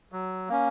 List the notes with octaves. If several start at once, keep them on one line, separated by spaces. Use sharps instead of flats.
F#3
A#3 C#4